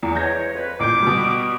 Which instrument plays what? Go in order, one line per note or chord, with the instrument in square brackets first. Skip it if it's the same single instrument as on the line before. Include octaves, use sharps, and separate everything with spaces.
[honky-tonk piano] E2
[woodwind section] E3 G#3 C#5 [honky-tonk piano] G6 A#6
[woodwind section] F2 B4
[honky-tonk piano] A1 A#2 G6 [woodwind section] D6
[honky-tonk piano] B2 G3